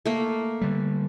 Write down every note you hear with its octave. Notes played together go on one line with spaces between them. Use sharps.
A3 A#3
D3 G3